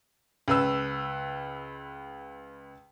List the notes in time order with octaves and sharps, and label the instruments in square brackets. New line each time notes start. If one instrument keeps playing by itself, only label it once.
[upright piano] C#2 B4 E6